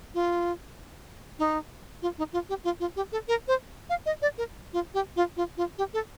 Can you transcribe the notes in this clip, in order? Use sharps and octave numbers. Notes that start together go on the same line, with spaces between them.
F4
D#4
F4
D#4
F4
G4
F4
F4
G4
A4
A#4
C5
F5
D#5
D5
A#4
F4
G4
F4
F4
F4
G4
A4